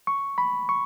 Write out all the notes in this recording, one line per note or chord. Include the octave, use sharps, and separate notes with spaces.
C#6
B5
C#6